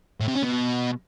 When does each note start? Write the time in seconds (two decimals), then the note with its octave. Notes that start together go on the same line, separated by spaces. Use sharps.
0.20 A2
0.28 C3
0.35 C#4
0.43 B2